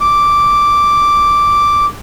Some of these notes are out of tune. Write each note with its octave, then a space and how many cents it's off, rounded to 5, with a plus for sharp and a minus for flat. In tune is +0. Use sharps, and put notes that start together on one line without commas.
D6 -5